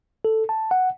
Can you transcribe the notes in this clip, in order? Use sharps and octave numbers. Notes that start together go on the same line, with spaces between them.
A4
A5
F#5